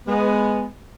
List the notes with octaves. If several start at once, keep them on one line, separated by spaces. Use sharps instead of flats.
G#3 B3